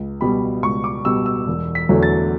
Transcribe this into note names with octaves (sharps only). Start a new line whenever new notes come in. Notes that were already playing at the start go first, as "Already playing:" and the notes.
Already playing: C#2
B2 G3 B5
C#2 C#6
D6
B2 G3 E6
E6
E1
B6
E2 D3 F#3 A3
A6